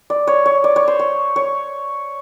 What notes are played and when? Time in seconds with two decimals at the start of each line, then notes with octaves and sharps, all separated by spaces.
0.10 D5
0.27 C#5
0.46 C#5
0.64 D5
0.76 C#5
0.88 C5
0.99 C#5
1.36 C#5